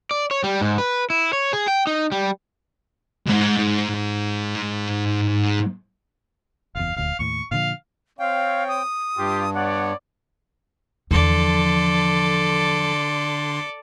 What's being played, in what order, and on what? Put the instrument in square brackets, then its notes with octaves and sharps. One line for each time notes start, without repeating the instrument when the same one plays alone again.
[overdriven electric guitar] D5
C#5
G3
G#2
B4
E4
C#5
G#4
G5
D#4
G3
[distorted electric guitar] B1 G#2
[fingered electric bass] F#1 E2 [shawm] F5
[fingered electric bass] D#1 D2 [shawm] F5
[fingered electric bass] D#2 A2 [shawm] C#6
[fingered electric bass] A#2 D3 F3 [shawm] F5
[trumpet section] C4 C#5 [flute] F5 [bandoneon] G5
[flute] D#6
[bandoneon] G2 [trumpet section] F4 G4
[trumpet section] B3 C#5 D5 [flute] F#5
[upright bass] E2 F3 [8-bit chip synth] D3 C6 [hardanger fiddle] A4 D5